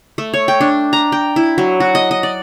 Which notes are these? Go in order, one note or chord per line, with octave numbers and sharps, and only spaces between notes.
A3
C#5
G5
D4
A#5
G5
E4
F#3
F#4
D#5
D#5
D5